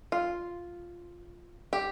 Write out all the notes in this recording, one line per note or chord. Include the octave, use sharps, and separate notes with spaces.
F4
G4